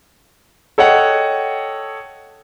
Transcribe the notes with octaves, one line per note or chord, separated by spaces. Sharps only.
A4 C#5 D#5 F#5 G5